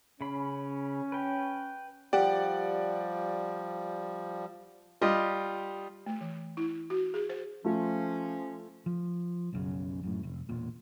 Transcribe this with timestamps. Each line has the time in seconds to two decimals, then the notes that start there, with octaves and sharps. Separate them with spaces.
0.21 C#3 C#4 B5
1.12 B4 G5
2.13 F3 G3 G4 D5 F#5
5.01 G3 F4 G4 D#5
6.06 A3
6.21 E3
6.57 E4
6.90 F#4
7.14 G#4
7.29 C5
7.65 F3 A3 C#4 F4
8.86 F3
9.53 B1 F#2 C#3
10.03 F#2 A2
10.23 F1
10.49 E1 A#2